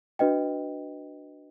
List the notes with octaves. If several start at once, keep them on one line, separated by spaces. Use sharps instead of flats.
D4 F#4 B4 D#5 G5